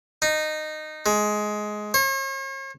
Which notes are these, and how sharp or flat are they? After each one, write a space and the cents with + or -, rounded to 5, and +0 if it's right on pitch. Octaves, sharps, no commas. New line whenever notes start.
D#4 -15
G#3 +15
C#5 -45